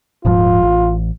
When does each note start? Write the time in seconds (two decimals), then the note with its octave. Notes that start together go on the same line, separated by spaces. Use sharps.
0.25 D#1 G#2 F3 F4
0.62 A1